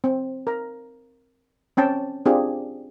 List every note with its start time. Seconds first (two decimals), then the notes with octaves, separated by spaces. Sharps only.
0.04 C4
0.47 A#4 A#5
1.77 C4 C#4 G5 A5
2.25 C4 D4 F4 G4 G#4